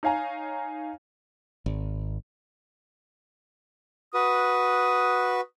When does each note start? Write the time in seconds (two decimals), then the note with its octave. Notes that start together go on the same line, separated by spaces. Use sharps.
0.03 D#4 C#5 F5 G#5 A#5
1.66 G#1
4.14 F#4 B4 D#6